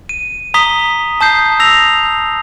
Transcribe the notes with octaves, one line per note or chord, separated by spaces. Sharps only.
D#7
A#5 D#6 B6 G7
A5 D#6 G6 C7
E6 A#6 F7